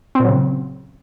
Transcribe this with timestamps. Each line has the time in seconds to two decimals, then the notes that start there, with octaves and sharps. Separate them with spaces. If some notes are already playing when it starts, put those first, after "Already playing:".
0.15 C4
0.20 A#2
0.24 F#3
0.29 C#3